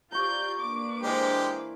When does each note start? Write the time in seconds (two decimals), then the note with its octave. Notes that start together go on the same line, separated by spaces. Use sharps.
0.12 F4 G4 D5 A#5 C#6 G6
0.60 A#3 D4 B4 D6
1.03 E3 G#3 G4 A#4 C5